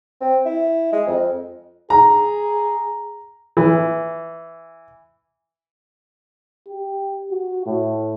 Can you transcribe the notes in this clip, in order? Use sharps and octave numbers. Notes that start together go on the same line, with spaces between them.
C4
E4
G#3
F2
G#4 A#5
E3
G4
F#4
A2